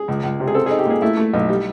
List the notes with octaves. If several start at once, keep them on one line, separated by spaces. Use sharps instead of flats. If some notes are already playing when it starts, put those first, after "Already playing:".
Already playing: G#4
C#2
C#2
C3
G#4
C4 A4
D#4 G#4
G4
A#2 G#4
A3 E4
A3
B1
G3